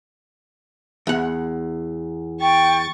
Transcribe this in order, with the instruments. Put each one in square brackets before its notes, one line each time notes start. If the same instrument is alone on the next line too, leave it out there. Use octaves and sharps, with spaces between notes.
[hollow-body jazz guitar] E2 F#5
[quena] G5 [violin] C#6 A6